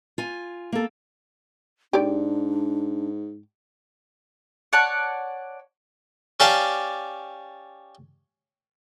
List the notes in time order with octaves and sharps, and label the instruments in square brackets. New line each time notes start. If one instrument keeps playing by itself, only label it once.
[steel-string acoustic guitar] F4 G#5
A#3 A4
[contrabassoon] G#2 [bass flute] D4 [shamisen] G4 D5
[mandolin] C#5 D5 F#5 A5
[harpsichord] C#4 G4 D5 F5 A5